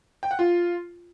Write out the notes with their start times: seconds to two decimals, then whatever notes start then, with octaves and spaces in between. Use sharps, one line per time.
0.23 G5
0.31 F#5
0.39 F4